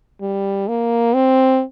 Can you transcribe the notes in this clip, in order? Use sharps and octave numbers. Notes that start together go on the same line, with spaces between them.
G3
A#3
C4